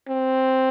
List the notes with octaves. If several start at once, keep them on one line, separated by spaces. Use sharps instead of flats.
C4